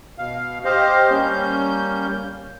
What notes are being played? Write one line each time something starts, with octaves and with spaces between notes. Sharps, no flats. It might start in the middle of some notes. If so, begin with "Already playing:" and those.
B2 F5
G4 C5 D#5 F5
G3 A#3 C#4 G6